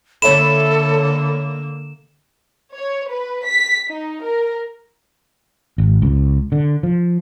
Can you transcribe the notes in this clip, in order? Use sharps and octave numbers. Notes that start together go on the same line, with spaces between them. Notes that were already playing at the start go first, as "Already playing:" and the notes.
D3 A#3 A4 C#5 E5 B5 E7
C#5
B4
B6
D#4
A#4
G#1
C#2
D3
F3